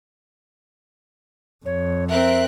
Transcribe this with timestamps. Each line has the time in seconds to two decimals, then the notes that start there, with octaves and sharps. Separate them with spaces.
1.66 F2 C#5
2.10 C4 A#4 E5 F#6